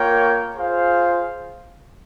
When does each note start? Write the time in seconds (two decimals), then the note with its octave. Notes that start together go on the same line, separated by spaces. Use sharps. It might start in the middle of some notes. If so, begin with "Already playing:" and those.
Already playing: A#3 F4 A#4 C#5 G5
0.54 F4 G#4 C5 F5